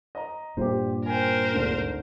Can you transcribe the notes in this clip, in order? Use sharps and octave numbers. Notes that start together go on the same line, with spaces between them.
D#5 A#5
G2 A#2 G4 C5
A#4 C5 G5 G#5
G#1 D2 G#2